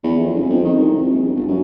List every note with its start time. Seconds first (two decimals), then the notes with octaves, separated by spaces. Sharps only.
0.04 E2
0.20 F2
0.35 G1
0.50 F2
0.65 D#3
0.79 C2
0.96 C2
1.11 A#1
1.24 G1
1.35 G1
1.48 F#2